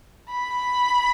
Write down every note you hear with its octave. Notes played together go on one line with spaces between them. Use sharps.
B5